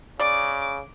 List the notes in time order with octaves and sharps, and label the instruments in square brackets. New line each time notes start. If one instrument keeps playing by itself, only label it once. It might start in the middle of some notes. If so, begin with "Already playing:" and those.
[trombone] C#3 [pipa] D5 [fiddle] D6